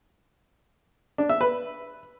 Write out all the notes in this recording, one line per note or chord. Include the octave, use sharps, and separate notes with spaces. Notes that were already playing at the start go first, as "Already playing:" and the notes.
D4
E5
B4